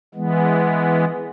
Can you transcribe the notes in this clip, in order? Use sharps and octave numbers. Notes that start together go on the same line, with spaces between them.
E3 G#3 B3